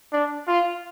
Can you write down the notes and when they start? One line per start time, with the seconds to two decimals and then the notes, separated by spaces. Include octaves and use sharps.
0.13 D4
0.48 F4